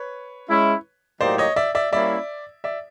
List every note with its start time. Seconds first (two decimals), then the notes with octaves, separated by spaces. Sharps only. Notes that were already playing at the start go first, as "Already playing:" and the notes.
Already playing: B4 C#5
0.50 G#3 C#4 E4
1.21 A2 F#3 A#3 D#4 G4 C5 D5
1.38 C#5 D#5
1.56 D5 E5
1.75 D5 E5
1.92 G3 A#3 C#4 E4 D5 E5
2.64 D5 E5